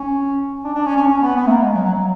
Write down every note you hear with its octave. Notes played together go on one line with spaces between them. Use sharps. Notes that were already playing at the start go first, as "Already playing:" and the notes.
Already playing: C#4
D4
D4
C#4
C#4
C#4
B3
B3
A3
A#3
G#3
F#3
F#3
F#3